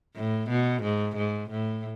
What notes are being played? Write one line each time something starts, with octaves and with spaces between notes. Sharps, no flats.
A2
B2
G#2
G#2
A2